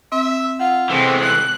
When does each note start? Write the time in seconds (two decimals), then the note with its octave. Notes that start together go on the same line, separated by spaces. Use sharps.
0.12 C4 E5
0.60 F4 F#5
0.90 C3 E3 G#3 C4 A4
1.20 F#6